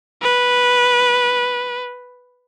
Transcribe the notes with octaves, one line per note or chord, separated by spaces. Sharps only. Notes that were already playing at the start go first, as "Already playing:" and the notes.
B4